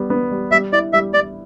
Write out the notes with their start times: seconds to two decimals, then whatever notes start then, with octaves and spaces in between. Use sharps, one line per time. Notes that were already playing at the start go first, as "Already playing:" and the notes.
Already playing: G3 B3
0.10 B3
0.31 G3
0.51 G3 E5
0.73 E4 D5
0.93 G3 E5
1.13 G3 D5